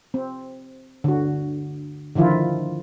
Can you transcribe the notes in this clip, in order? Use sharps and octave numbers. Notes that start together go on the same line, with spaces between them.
C4
D3 F#4
D3 D#3 F3 E4 F4